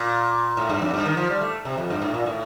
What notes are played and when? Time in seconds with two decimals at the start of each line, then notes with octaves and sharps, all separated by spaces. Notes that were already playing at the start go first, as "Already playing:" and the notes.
Already playing: A#2
0.57 A2
0.69 G2
0.82 F2
0.94 G2
1.06 D#3
1.17 F3
1.30 G3
1.41 A3
1.65 C3
1.78 F2
1.90 G2
2.02 A2
2.14 A#2
2.26 A2